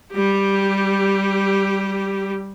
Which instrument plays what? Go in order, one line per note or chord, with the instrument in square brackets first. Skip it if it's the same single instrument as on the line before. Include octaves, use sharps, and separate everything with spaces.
[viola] G3 G4